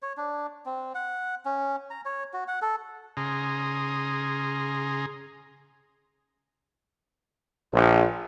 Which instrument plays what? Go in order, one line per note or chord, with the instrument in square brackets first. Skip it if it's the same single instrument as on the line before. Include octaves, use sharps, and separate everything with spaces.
[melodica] C#5
D4
C4
F#5
C#4
A#5
C#5
F#4
F#5
A4
[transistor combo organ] C#3 G#4 A#5 C6 D#6
[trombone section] A#1